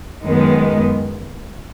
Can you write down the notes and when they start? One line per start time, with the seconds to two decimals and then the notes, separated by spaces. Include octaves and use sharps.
0.22 F#2 D#3 G#3 B3